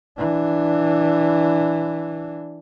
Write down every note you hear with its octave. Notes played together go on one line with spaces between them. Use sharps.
E3 D4